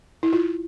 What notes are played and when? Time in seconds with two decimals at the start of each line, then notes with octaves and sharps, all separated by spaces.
0.23 E4
0.33 F4